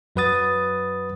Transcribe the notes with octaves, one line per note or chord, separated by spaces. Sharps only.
F#2 F#3 B4 F#5 D#6 A6